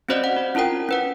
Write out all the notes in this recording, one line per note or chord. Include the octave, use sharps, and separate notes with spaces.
C4 C#4 F#4 C5 D5 D#5
F#5
F#4
C#4 E4 F4 A#4 G5
C#4 B4 F#5